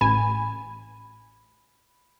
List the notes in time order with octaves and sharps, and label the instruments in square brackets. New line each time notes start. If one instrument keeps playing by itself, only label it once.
[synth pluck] A1 G#5 [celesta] B5